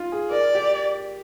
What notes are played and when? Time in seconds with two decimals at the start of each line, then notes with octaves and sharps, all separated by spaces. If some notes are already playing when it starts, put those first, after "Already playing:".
Already playing: D#4 F4
0.12 G#4
0.31 A#4 D5
0.55 G4